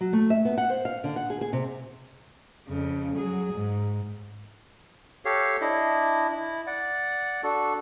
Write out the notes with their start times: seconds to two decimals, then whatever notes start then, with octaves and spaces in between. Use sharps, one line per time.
0.01 F#3
0.13 A3
0.30 E5
0.45 B3
0.58 F#5
0.70 C5
0.85 F5
1.04 D3
1.16 F#5
1.30 G#4
1.41 G#4
1.53 C3
2.67 F2 C#3
3.17 F#3 G#4
3.53 G#2
5.25 G4 A4 C#5 F5
5.61 D4 E4 D#5
6.31 E4
6.67 D5 F#5
7.43 D4 F#4 A4